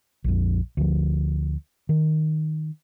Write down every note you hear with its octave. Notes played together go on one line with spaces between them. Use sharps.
A#1 F2
D2 F3
D#3